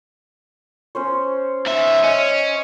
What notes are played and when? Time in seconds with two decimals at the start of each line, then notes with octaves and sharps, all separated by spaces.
0.95 C#4 C5 C#5
1.66 G#2 E5
2.04 C#4 D#5